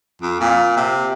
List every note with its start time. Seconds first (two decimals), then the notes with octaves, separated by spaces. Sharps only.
0.22 F2
0.40 A#2
0.77 C3